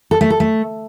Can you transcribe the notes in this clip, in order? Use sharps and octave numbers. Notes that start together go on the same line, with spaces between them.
A4
A3
A4
A3